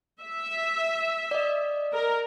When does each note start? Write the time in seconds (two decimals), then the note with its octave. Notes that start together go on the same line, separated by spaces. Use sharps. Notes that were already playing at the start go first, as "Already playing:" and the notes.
0.21 E5
1.31 D5 D#5
1.93 A#4